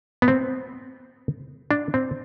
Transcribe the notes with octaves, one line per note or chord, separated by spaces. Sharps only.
B3
C4
D4
C4